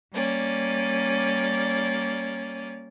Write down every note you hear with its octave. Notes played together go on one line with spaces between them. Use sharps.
G3 A#3 C#4 D5